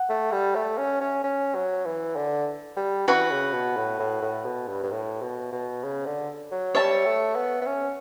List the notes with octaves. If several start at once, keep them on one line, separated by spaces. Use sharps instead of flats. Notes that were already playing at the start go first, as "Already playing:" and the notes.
Already playing: F#5
A3
G3
A3
C#4
C#4
C#4
F#3
E3
D3
G3
E3 F#4 B4 F#5 C#6
C#3
B2
A2
A2
A2
B2
G2
G2
A2
B2
B2
C#3
D3
F#3
G3 C#5 E5 A5
A3
B3
B3
C#4